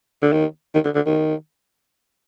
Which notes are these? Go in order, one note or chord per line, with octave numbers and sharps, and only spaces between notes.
D3
D#3
D#3
D3
D3
D#3